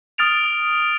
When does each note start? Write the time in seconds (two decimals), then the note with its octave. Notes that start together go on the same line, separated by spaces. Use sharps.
0.18 D#6 F6 A6 D7 F7